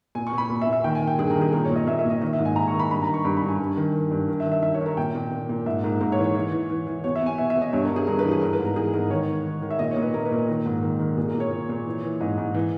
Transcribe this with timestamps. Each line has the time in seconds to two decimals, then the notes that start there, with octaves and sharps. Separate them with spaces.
0.15 A#2 G#5
0.27 C#6
0.32 A#2
0.38 B5
0.50 A#2
0.62 E5
0.67 A#2
0.73 E5
0.84 D#3 G5
0.95 G#5
1.02 D#3
1.07 G5
1.18 G2 G#4
1.30 A#4
1.36 D#3
1.41 G#4
1.53 A#2 A#4
1.65 C#5
1.70 A#2
1.76 D#5
1.87 A#2 E5
1.99 E5
2.05 A#2
2.10 D#5
2.21 D#3 D#5
2.33 E5
2.39 G#2
2.45 G#5
2.56 D#3 A#5
2.68 C#6
2.74 D#3
2.79 B5
2.91 G2 B5
3.03 A#5
3.08 D#3
3.14 C#6
3.25 G2 B5
3.37 B5
3.42 G2
3.48 G#5
3.59 G2
3.77 D#3
3.94 D#3
4.11 G2
4.28 D#3
4.40 E5
4.45 D#3
4.52 E5
4.63 D#3 E5
4.74 C#5
4.81 D#3
4.86 A#4
4.97 A#2 G5
5.15 A#2
5.31 A#2
5.49 A#2
5.66 G#2 E5
5.84 G#2 A#4
6.01 G#2 A#4
6.12 C#5
6.18 E3
6.24 C#5
6.35 E3
6.52 E3
6.70 E3
6.87 E3
7.04 B2 C#5
7.16 E5
7.21 B2
7.26 G#5
7.38 B2 E5
7.50 E5
7.55 B2
7.62 D#5
7.73 G2 C#5
7.84 A#4
7.90 G2
7.96 G#4
8.07 G2 A#4
8.19 B4
8.24 E3
8.31 G#4
8.42 E3 A#4
8.53 B4
8.59 G#2
8.65 A#4
8.76 E3 G#4
8.93 G#2 A#4
9.10 D#3 C#5
9.28 D#3
9.45 D#3
9.62 D#3
9.71 E5
9.79 A#2 D#5
9.91 C#5
9.97 A#2
10.03 B4
10.14 A#2 A#4
10.25 B4
10.31 A#2
10.37 A#4
10.48 D#3 A#4
10.66 G#2
10.83 D#3
11.00 D#3
11.17 A#2 G#4
11.28 A#4
11.34 A#2
11.40 C#5
11.51 A#2
11.69 A#2
11.86 E3
12.03 E3
12.21 G#2 D#5
12.38 G#2
12.54 E3